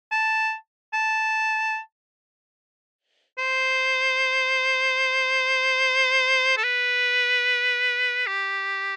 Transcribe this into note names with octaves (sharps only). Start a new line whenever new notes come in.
A5
A5
C5
A4
B4
G4